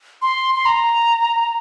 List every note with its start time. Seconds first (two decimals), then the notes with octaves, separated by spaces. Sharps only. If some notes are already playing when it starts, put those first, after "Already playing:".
0.22 C6
0.55 C6
0.65 A#5